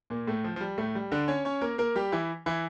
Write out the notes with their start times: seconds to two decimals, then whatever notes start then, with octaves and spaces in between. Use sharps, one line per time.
0.10 A#2 A#3
0.27 A2 A3
0.44 F3
0.56 F3
0.61 G3
0.77 A2 A3
0.95 G3
1.12 D3 D4
1.28 C#4 C#5
1.45 C#4 C#5
1.61 A#3 A#4
1.78 A#3 A#4
1.95 G3 G4
2.12 E3 E4
2.46 E3 E4